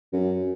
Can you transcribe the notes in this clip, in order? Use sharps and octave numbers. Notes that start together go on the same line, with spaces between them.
F#2